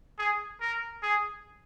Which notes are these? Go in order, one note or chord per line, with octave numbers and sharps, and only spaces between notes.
G#4
A#4
G#4